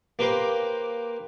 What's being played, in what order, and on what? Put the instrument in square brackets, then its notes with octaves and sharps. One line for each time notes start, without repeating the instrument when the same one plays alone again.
[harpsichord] A#3 G4 B4 C5